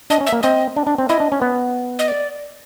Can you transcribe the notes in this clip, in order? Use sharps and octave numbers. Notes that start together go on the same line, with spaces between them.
D4 D#5
C#4
E5
A#3
C4 D#5
D4
D4
C4
E4 D#5
D4
C#4
B3
D#5
D5